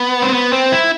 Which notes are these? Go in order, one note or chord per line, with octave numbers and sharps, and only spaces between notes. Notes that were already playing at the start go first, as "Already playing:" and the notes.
Already playing: B3
C4
B3
C4
E4